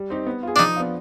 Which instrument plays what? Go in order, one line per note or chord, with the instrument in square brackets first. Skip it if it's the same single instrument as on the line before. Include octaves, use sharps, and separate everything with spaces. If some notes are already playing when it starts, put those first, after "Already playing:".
Already playing: [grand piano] G3
C4 D#4 G4
B3
F4 G#4
[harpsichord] D4
[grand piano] F3 [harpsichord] D#4
[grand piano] B3 D4 F4